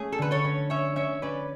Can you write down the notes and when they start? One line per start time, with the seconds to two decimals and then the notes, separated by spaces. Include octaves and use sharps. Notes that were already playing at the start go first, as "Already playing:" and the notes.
Already playing: A3 C#4 G#4
0.12 A4
0.18 D3 B4
0.31 A4 C#5
0.45 C#4
0.70 C#4 C#5 E5
0.96 C#4 C#5 E5
1.22 C#4 B4 D5